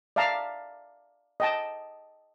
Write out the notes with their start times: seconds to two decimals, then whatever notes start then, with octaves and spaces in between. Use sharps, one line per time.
0.16 D5 E5 F5 A5 A#5
1.40 D#5 G5 A5